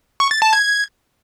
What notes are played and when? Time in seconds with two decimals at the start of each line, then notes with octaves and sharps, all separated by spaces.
0.20 C#6
0.31 A6
0.42 A5
0.53 G#6